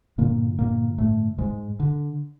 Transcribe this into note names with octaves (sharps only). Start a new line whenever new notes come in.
G2 A#2 D3 A#3
A#2 A#3
A2 A3
G#2 G#3
D3